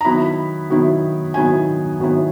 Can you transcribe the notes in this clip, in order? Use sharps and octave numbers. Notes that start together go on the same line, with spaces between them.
A#5
D#3 F#3 B3 E4 B5
D#3 F#3 B3 E4
D#3 F#3 B3 E4 G#5
D#3 F#3 B3 E4